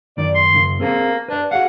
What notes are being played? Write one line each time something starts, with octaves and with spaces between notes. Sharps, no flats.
F#2 D#3 D5
C6
F#2 C#3
A#3 C4 G#4 A4
D4 B4 D5
F#4 G#4 F5 F#5